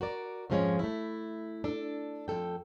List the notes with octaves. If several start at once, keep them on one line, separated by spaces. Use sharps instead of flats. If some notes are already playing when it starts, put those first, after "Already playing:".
F#4 A#4 D5
F2 G#2 F3 G#3 C#4 C#5
A3 E4
D4 A4
F2 D#3 A4 G5